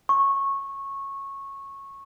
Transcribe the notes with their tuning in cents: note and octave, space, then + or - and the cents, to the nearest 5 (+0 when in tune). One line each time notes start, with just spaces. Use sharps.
C#6 -15